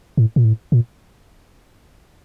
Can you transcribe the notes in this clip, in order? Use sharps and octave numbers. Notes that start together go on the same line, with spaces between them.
A2
A#2
A2
A#2